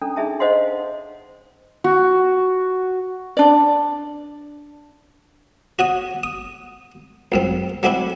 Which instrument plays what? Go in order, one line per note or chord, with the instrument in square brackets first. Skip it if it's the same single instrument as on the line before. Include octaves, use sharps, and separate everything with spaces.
[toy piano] C#4 D4 A4 A#5
D4 D#4 G#4 E5 A5
C5 C#5 D#5 F5 F#5 C6
[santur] F#4
[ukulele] D4 D5
[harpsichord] F#4 C#5 D#6
D#6
C#2 F#2 C4
F#3 A3 C4 D4 E4